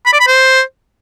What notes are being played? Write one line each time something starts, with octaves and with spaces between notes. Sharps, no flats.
B5
D5
B5
C5